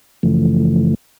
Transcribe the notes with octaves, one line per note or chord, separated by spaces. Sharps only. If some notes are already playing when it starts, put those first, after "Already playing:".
F#2 C#3 E3 F3 A3